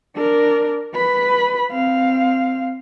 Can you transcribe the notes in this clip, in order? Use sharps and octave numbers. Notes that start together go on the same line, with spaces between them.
D4 A#4
B4 B5
C4 F5